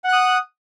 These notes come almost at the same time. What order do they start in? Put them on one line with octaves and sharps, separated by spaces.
F#5 F#6 D#6